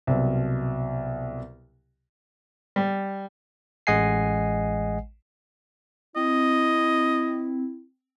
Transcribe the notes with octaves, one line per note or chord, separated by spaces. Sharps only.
C2 B2 F#3
G3
A1 G#3 D#5 F#5 G#5 C7
C4 E4 D#5